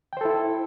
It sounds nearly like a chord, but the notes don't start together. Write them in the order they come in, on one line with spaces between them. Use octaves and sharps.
G5 C5 A4 E4